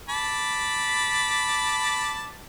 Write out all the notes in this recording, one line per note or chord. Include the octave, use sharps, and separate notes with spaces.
A5 B5 D6